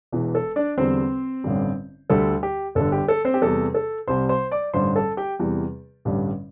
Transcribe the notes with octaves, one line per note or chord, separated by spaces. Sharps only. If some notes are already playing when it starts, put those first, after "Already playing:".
E1 E2 E3
A4
D4 D5
E2 D3 G3 C4 C5
A1 G2 D3 G3
D2 D3 G3 A4
G4
G1 G2 D3 A4
G4
A4
C4 C5
G4
E2 C3 G3 A4
A4
C2 C3 G3 C5 C6
C5 C6
D5 D6
A1 G2 D3 G3 C5 C6
A4 A5
G4 G5
E2 C3 E3 G3
A1 G2 D3 G3